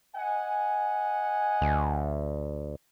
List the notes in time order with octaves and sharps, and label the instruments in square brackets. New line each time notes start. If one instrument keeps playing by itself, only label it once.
[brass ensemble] D#5 F#5 G#5
[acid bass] D2